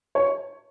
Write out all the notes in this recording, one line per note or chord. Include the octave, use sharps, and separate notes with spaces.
C#5